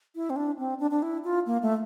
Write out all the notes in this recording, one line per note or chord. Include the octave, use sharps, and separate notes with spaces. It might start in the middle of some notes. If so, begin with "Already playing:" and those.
E4
C4
D4
C4
D4
D4
E4
F4
A#3
A3